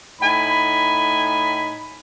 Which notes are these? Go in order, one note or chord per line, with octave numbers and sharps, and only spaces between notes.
A2 D#4 G#5 B5